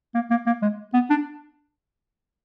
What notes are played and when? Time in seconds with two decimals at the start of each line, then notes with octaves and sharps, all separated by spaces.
0.15 A#3
0.30 A#3
0.46 A#3
0.62 G#3
0.94 B3
1.10 D4